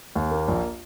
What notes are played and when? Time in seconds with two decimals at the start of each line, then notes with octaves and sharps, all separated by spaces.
0.15 D#2
0.31 A#3
0.48 A#1